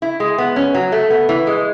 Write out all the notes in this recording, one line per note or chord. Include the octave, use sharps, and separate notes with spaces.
E4
G#3
B3
C#4
F#3
A3
B3
E3
G#3